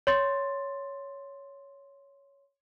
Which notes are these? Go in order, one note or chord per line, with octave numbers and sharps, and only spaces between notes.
C#5 C6 A6